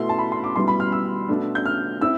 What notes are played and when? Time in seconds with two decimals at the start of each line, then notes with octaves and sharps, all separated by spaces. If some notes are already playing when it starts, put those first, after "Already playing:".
Already playing: B2 A3 E4 C6
0.09 A5
0.19 B5
0.32 C6
0.44 D6
0.56 B2 G3 B3 E4 C6
0.68 B5
0.80 F6
0.92 E6
1.28 B2 A3 D4
1.55 G6
1.66 F6
2.01 C4 E4 E6